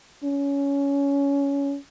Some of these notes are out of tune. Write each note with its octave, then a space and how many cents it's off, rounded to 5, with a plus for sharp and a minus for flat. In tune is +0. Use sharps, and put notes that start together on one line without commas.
C#4 +20